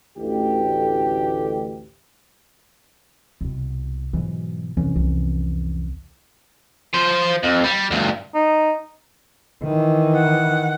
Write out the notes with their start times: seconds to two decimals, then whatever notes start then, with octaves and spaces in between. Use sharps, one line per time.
0.17 A1 D2 G4
3.41 C2 B2
4.13 G#2 B2 E3 F#3
4.77 C2 F2 E3 C#4
4.96 C2
6.94 F3 C5
7.43 F2
7.64 G3
7.91 D2 G2
8.35 D#4
9.64 D#3 E3
10.16 F#5